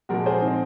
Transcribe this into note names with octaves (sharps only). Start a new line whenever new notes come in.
A#2 F3 G#3 F#4 A#4
G#4 C5
C4 D#4